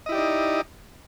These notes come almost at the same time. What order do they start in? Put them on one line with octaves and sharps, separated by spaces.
D#5 E4 G4 D5 D#4